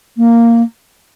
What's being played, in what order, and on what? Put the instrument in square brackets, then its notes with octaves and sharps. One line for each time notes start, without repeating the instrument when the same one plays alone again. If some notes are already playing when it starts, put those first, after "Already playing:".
[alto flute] A#3